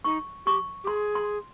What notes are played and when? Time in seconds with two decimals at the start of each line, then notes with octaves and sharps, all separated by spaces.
0.05 D#4 C#6
0.46 G4 C#6
0.84 G4
0.87 G#4 C6
1.15 C6